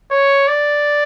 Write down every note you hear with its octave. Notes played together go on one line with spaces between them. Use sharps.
C#5
D5